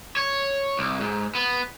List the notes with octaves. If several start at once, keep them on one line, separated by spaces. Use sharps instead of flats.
C#5
C2
G#2
B3